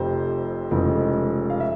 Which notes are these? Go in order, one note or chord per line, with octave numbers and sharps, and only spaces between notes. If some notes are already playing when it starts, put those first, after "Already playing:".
Already playing: F1 F2 C3 C5
F1 F2 C#3 E3 G#3
F5
E5